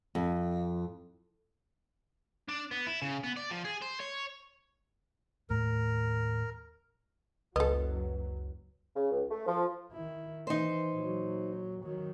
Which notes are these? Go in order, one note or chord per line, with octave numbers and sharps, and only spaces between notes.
F2
D4
B3
E4
C#3
B3
D5
F3
G#4
C5
C#5
D#2 A2 A3 A#4
F#1 C#2 F#3 A4 B4 D#5
C#3
C#2
A3
F3
D#3 E4
E3 D#4 C5
A#2 F#3
D#3 F#3